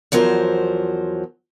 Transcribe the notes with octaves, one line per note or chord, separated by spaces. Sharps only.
E2 F3 F#3 A#4 C5